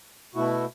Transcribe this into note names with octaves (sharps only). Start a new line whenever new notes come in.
B2 A3 E4 F#4